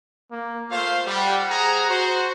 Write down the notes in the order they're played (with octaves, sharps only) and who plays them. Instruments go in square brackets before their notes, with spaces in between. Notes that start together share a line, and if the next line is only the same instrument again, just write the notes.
[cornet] A#3
[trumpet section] A3 C5 F5 [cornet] F4
[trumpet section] G3 [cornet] F#5
[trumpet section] G#4 C5 A#5
F#4 C5